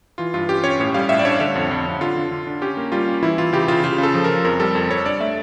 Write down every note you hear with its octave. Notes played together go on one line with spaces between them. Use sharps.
E3 F4
G2 F4
C#4 G4
C#4 C#5
A2
G3 F5
A2 E5
D5
D4 C#5
D3 C#5
F2
F2
F2
D3 F4
D3
D3
D4
C#4 G4
A#3
G3 F4
C#4
E3 E4
E3 F4
C#3 G4
C#3 F4
C#3 F4
C#3 A4
F3
A#4
C#3
F2 A#4
G3 A4
F2
F2 C#5
D4 D5
A3 E5